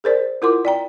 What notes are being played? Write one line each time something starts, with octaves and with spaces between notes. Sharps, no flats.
G#4 A#4 C5 D5
E4 F4 A#4 F#5 C6 D6
D5 G5 A#5